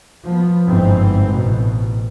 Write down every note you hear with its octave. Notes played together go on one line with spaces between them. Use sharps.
F3 B3
G1 G#2 E3 C4
A1 B2